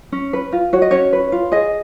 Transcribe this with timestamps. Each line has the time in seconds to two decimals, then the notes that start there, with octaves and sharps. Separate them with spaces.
0.12 C#4
0.33 B4
0.52 F4
0.73 F#4 C#5
0.82 D#5
0.91 C#4 C#5
1.13 B4
1.32 F4
1.52 G#4 D#5